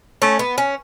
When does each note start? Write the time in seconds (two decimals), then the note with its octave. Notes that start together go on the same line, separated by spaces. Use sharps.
0.22 A3 C#4
0.39 B3
0.58 C#4